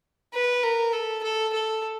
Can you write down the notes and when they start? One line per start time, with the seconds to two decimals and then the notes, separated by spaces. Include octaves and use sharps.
0.34 B4
0.63 A#4
0.93 A4
1.23 A4
1.53 A4